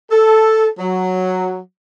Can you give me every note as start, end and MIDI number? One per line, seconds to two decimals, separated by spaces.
0.11 0.68 69
0.78 1.57 54